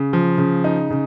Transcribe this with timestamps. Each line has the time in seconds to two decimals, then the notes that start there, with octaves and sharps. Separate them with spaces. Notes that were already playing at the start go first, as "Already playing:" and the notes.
Already playing: C#3
0.13 F3
0.38 C#3
0.64 D#4
0.91 C#3